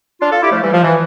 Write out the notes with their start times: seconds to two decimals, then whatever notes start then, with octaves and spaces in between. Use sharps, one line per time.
0.21 D4 F4
0.31 F4 A4
0.42 E4 G4
0.52 F3 A3
0.62 E3 G3
0.73 F3
0.83 E3